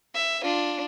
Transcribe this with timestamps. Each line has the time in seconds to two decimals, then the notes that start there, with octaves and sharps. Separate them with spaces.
0.15 E5
0.44 D4 F4